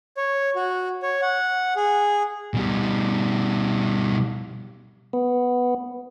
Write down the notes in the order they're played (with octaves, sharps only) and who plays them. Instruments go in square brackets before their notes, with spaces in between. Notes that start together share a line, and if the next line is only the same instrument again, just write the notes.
[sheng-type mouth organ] C#5
F#4
C#5
F#5
G#4
[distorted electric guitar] B2 G3
[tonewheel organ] B3